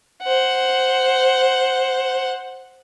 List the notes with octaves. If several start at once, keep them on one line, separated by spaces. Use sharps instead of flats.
C5 F#5